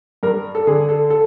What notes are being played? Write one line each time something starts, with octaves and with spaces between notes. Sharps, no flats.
G2 A#4
A4
D3 G#4
A4
A4